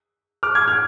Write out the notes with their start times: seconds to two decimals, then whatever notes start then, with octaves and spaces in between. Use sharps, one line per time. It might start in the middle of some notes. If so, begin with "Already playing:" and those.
0.43 D6 F6
0.55 F6 G#6
0.68 F6 G#6